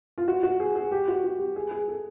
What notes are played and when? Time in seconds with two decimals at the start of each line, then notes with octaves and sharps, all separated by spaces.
0.18 F4
0.28 F#4
0.43 F#4
0.60 G#4
0.75 G#4
0.91 G4
1.08 F#4
1.24 F#4
1.39 G4
1.56 G#4
1.71 G#4
1.88 A4